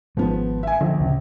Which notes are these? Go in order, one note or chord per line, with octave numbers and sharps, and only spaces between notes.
G#1 G#2 F3 G#3 B3
E5 G#5
A#1 D3
D1 C#3 C#4